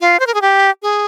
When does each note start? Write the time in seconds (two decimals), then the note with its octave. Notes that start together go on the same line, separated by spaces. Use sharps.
0.01 F4
0.20 C5
0.27 A#4
0.34 G#4
0.41 G4
0.82 G#4